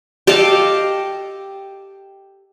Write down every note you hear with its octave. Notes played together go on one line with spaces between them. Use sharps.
G4 A4 D#5 F5